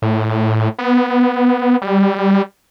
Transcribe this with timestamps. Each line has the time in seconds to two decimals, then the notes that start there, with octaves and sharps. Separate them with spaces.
0.02 A2
0.79 B3
1.82 G3